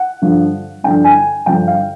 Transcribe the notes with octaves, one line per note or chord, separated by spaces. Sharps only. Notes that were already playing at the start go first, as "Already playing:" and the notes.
Already playing: F#5
G2 D3 F3
G2 D3 F3 G5
G#5
G2 D3 F3 G5
F5